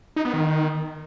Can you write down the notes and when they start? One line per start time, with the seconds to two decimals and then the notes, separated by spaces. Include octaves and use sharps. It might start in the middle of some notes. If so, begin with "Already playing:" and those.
0.16 D#4
0.25 B3
0.34 D#3